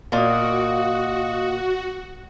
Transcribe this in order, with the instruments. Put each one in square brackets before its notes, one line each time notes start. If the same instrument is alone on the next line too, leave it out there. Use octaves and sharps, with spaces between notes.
[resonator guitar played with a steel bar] A#2 A#3 [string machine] F#4 [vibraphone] D#5 F5 D#6